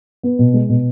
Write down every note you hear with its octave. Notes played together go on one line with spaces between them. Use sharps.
B3
B2
G#3
B2